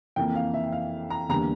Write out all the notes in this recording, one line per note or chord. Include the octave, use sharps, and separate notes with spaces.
F2 E3 A#3 G5
F5
E5
F5
A#5
E2 D3 G3 A#3 A#5